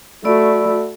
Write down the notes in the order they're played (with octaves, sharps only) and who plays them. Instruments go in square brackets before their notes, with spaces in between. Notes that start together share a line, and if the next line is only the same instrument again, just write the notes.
[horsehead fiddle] A3 F#4 [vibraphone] D5 B5 E6